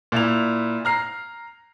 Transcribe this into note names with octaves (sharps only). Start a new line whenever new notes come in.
A#2 E4 F7
A#5 F6 C7